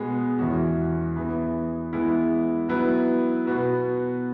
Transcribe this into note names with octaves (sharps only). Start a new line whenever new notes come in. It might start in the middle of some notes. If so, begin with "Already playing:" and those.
Already playing: B2 G#3 B3 G#4
E2 E3 C#4 F#4
E3 B3 G#4 B4
E3 G#3 B3 E4
F#3 B3 E4 B4
B2 B3 F#4 B4